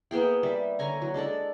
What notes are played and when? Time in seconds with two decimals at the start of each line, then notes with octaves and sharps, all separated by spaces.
0.11 A#3 B3 G#4 G5
0.43 G3 E5
0.79 D3 C#5 G#5 A#5
1.02 F#3
1.14 G#3 D4 A4 D5